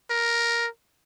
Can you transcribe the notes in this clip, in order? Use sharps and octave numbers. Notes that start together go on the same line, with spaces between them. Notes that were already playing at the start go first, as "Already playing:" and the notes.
A#4